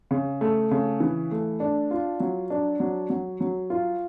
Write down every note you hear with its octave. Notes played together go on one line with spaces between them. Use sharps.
C#3
A3
C#3
E3
A3
D4
F4
F#3
D4
F#3
F#3
F#3
F4